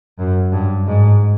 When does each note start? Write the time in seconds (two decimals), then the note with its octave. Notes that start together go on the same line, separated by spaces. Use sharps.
0.19 F#2
0.52 G2
0.87 G#2